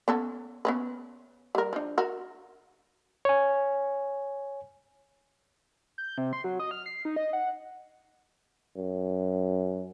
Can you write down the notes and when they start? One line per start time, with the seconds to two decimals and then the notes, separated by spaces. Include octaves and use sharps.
0.08 B3 C#4 A4
0.65 B3 C#4 B4
1.55 G3 A#4
1.73 F3 D4
1.98 F#4 A#4
3.25 C#5 G#5
5.98 G6
6.18 C3
6.33 C6
6.44 F#3
6.59 D#5
6.71 F6
6.86 C7
7.05 D#4
7.16 D#5
7.33 F#5
8.76 F#2